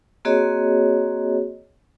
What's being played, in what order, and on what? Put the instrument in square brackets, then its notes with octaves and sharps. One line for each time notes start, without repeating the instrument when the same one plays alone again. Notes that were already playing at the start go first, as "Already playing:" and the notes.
[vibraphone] A#3 C4 F#4 G#4 C#5 D#5